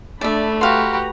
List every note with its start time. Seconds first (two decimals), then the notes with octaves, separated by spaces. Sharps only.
0.21 A3 D4 D5 E5 B5
0.61 F#4 G4 B4 F5 A#5 C6